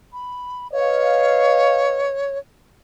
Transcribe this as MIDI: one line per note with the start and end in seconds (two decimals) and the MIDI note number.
0.13 0.67 83
0.72 2.12 71
0.72 2.38 73
0.72 2.12 75
0.72 2.12 77